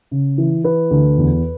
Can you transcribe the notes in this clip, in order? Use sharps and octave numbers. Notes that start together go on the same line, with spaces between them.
C#3
E3
E3 B4
D2
E2